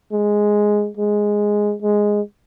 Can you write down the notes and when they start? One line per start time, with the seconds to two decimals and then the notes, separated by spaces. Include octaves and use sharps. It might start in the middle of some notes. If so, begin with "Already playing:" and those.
0.12 G#3
0.97 G#3
1.82 G#3